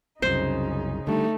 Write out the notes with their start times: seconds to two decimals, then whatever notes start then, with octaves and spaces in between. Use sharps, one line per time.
0.22 C2 F#2 C#3 D#4 C5
1.07 D3 G3 A3 D#4